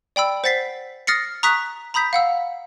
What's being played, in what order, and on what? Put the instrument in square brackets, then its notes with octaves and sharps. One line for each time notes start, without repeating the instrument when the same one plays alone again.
[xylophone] D5 G5 B5 E6
C5 F#5 A6 B6 C7
D#6 F6 A6 A#6 C7 C#7
A#5 C#6 D#6 F#6 B6
A#5 B5 D#6 G6 B6
F5 F#5 E6